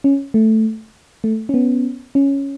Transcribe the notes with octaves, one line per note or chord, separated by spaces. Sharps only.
C#4
A3
A3
C#4
B3
C#4